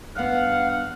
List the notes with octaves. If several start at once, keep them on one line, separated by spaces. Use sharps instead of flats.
G2 B3 F5 F#5